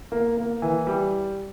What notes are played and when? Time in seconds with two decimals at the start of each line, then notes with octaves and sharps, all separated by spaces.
0.12 A#3
0.37 A#3
0.62 E3
0.87 G3